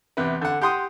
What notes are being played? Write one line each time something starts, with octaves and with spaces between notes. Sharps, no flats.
E2 C3 B4
D3 F#5
G4 F#5 C6 D#6